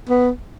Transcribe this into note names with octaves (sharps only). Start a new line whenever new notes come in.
B3